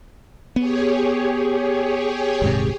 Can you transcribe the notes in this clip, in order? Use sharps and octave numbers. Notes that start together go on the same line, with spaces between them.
B3 G4 G#4 C#5
D#1 G#2 C3